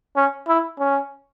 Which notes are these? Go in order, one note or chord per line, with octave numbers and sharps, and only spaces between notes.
C#4
E4
C#4